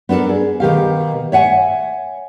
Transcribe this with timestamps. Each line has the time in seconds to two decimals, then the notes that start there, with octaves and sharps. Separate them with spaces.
0.09 B3 D4 F4 A4 A#4
0.29 G#4
0.60 B2 D#3 G4 F5
1.32 C#5 E5 F#5 G#5